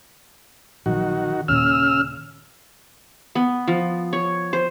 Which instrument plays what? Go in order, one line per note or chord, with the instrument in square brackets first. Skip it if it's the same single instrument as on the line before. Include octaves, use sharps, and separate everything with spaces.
[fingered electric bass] A#1 F#3 [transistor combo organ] D#3 F#4
[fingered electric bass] D#2 A#2 [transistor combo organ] C#3 E6 F6
[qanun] B3
F3
C#5
C5